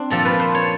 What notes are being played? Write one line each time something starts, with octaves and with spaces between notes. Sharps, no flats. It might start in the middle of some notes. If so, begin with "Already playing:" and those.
Already playing: C4 D4
A#2 F3 A4
B4
C5
C#5